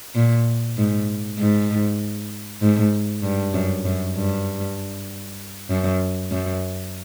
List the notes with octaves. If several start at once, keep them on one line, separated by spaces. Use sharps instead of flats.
A#2
G#2
G#2
G#2
G2
F#2
F#2
G2
F#2
F#2